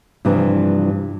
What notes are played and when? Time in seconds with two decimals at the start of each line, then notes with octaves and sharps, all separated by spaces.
0.25 G2 C3 E3 F3 G3